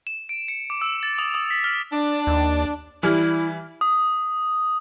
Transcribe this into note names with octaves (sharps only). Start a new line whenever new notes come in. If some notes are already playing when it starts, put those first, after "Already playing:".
E7
D7
C#7
D6
E6
A6
D#6
D#6
B6
F6
D4
D#2
E3 G3 E4 F6
D#6